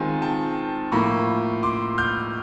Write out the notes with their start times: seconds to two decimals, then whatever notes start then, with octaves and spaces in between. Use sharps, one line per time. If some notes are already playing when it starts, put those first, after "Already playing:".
Already playing: D#3 G#3 C4 F4 G#5
0.22 G5 A5
0.92 A2 F3 A#3 B5 C#6
1.63 C6 D6
1.98 F6 G6